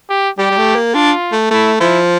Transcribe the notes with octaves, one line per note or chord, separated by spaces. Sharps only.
G4
G3 G4
G3
A3
A#3
D4 F4
A3
A3 E4
F3 E4